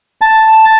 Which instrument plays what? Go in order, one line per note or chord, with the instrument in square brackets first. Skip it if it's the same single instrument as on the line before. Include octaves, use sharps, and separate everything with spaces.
[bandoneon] A5